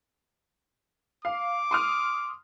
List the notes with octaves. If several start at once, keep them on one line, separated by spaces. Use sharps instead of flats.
F5 D6
C6 D#6 F6